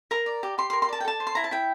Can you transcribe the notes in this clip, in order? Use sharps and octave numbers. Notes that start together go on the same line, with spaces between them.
A#4 A#5
D5
G4
G4 C6
C6
A#4
C6
D5 A5
G5
A4 A5
C5
C6
E4 A#5
A5
E4 G5